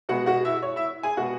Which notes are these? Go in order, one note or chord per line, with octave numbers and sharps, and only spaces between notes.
B2 G#3 B3 F#4 F#5
F#4 F#5
E4 E5
C#5
E4 E5
G#4 G#5
B2 G#3 B3 F#4 F#5